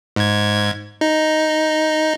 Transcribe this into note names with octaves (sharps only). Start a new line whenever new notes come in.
G#2 G#6
D#4